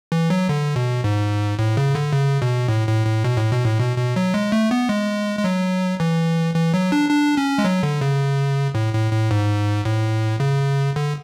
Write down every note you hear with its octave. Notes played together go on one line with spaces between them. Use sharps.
E3
F#3
D3
B2
G#2
A2
C#3
D3
C#3
B2
A2
A2
A2
B2
A2
B2
A2
B2
B2
F#3
G#3
A3
B3
G#3
G#3
F#3
E3
E3
F#3
D4
D4
C#4
G#3
F#3
D3
C#3
A2
A2
A2
G#2
A2
C#3
D3